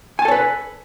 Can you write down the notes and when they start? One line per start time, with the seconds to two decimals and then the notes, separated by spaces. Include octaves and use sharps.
0.19 G#5
0.22 A5
0.25 A4
0.28 C#5
0.31 B4